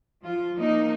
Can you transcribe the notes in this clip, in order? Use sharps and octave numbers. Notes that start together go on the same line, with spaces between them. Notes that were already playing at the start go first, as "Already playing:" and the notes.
F3 F4
F3 A#3 D#4